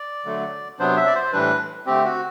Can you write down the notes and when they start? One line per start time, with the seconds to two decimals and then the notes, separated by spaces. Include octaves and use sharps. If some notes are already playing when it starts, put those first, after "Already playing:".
Already playing: D5
0.25 D3 F#3 A3
0.79 C3 F#3 B3 D4 C5
0.97 E5
1.07 D5
1.15 C5
1.33 A2 E3 G3 D4 B4
1.86 D3 A3 C4 G4
2.05 F#4